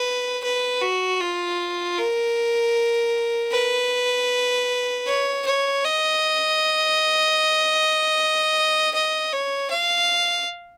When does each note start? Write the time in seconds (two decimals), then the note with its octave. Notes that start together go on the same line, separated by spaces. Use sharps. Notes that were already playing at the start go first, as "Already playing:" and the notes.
Already playing: B4
0.44 B4
0.82 F#4
1.21 F4
1.98 A#4
3.52 B4
5.07 C#5
5.46 C#5
5.85 D#5
8.94 D#5
9.33 C#5
9.71 F5